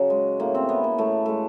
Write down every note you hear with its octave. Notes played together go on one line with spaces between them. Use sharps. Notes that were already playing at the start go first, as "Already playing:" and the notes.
Already playing: C#3 F#3
G#3
A2 A#3
C4
E3 B3
A#3
A2 A3
G#3 A3